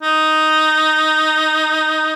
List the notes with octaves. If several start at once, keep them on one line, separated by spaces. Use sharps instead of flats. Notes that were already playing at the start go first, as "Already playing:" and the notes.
D#4